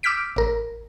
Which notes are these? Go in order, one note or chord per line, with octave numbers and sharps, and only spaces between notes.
D6 E6 F6 G6 B6 D7
A1 A#4